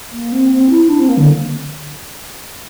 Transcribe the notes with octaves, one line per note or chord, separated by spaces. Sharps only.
A#3
C4
C4
E4
D4
C4
A#3
D3